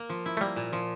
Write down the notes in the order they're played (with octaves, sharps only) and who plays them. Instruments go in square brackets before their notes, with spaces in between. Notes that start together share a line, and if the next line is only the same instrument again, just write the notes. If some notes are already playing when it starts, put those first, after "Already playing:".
Already playing: [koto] A#3 A#4
F3
E4
[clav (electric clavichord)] A3
[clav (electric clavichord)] G3 [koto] A#3
[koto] A#2
F3